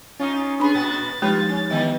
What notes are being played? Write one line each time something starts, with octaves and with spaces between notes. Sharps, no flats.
C#4 D#4 F4
B3 D4 G#4 B5
A#2 B3 F#4 A6
F3 G#3 D#4 F4 G4 B4 C#5
C#4
D#3 E3 B3 D#5 G5